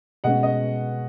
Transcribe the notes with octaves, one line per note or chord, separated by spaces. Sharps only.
B2 G#3 C#4 D#5 F#5
D#5